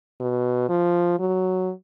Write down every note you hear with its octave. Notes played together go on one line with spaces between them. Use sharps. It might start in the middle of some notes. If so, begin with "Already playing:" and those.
B2
F3
F#3